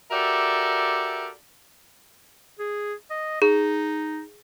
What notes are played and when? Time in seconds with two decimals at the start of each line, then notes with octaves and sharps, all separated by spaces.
0.11 F#4 G4 A4 A#4 D5 E5
2.59 G#4
3.10 D#5
3.42 D#4 G#4